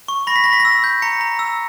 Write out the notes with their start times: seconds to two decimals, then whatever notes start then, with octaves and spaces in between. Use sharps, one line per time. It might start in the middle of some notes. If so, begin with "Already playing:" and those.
0.08 C#6
0.27 B5 A#6
0.36 B6
0.44 B5 A#6
0.53 B6
0.60 E6 A#6
0.84 G6
1.02 A#5 C#7
1.21 A#5
1.39 E6